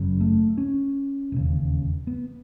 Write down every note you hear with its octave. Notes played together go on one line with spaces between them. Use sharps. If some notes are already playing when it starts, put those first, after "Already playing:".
Already playing: F#1 F#2 C#3
A3
C#4
E1 D#2 C#3
B3